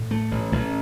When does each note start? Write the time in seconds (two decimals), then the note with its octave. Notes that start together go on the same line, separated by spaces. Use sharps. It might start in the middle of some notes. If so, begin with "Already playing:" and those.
Already playing: A2
0.11 A3
0.31 A1
0.52 A1